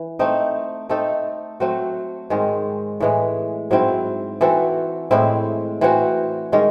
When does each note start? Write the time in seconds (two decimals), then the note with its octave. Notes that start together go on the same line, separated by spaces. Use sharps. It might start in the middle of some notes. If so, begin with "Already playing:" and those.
Already playing: E3
0.19 A3 C4 D#4
0.89 A3 C4 D#4 A4
1.60 F#3 A3 C4 F#4
2.30 G#2 D#3 G#3 C4
3.00 A2 E3 G#3
3.71 G#2 F#3 C4 E4
4.41 E3 C4 F#4 A4
5.11 A2 G#3 C4 E4
5.81 E3 C4 F#4 C#5
6.52 D#3 G#3 C#4